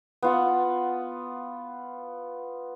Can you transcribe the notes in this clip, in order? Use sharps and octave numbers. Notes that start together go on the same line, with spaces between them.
B3 F4 F#5